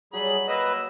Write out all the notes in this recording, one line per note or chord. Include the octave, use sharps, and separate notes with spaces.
F#3 G3 G#4 B5
A#3 B4 D#5 B5 E6